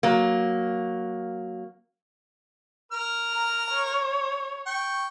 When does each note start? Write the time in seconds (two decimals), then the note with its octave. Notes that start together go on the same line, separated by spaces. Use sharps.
0.03 F#3 A#3
2.92 A#4 F6
3.33 A#5
3.72 C#5
4.66 G5 C#6